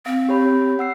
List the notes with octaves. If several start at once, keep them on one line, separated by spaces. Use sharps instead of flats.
C4 F5
G4 C#5 B5
F#5 E6 C7